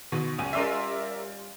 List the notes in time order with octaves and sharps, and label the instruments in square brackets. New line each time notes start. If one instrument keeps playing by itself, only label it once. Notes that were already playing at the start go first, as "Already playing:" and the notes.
[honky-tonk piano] B2 [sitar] D3
[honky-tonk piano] C#2 G#5 D#7 [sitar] F#3 A#3
[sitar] G3 C#4 F4 [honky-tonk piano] A#4 D5 E5